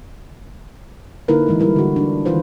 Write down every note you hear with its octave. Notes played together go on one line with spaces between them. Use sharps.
D3 A#3 D#4 E4 A#4 B4
E3 G#3 A#4
G3 E4 A#4
D3 F4 F#4
D4
D#3 E3 F4 B4 C5